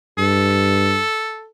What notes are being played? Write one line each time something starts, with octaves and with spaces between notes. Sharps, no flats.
G2 A4